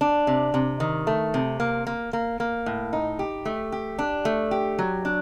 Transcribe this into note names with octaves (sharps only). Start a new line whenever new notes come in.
D4
C3
C3
D#3
A3
C3
A#3
A#3
A#3
A#3
A2
D#4
G4
A3
G4
D4
A3
G4
F#3
D4